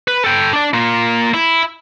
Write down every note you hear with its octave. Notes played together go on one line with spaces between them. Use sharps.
B4
A4 G5
D4 D5
A#3 F4
E4